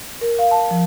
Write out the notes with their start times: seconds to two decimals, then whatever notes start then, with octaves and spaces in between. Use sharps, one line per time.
0.21 A#4
0.39 F5
0.51 A5
0.71 F3